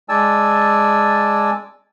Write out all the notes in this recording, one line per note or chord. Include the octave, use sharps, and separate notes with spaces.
G#3 D5 G#5 A5 E6